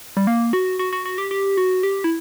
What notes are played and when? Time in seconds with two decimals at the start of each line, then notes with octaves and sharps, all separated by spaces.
0.17 G3
0.27 A#3
0.53 F#4
0.79 F#4
0.93 F#4
1.06 F#4
1.18 G4
1.31 G4
1.57 F#4
1.83 G4
2.04 E4